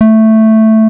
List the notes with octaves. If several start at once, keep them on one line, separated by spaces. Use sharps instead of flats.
A3